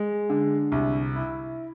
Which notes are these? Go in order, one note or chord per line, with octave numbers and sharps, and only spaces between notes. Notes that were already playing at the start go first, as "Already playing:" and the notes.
Already playing: G#3
D3
C2
E4